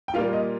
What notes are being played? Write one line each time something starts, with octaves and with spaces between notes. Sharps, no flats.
G5
A#2 G3 A#3 F4 F5
D#5